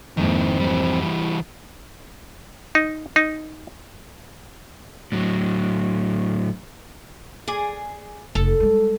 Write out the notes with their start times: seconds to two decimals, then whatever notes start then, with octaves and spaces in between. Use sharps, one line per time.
0.17 F2 G#2 D#3 A#3 C4 E4
0.60 E3 G3
1.02 E4
2.75 D#4
3.16 D#4
5.12 A2 F#3
7.48 G#4 D5
8.35 F1 A4
8.60 G3 G#3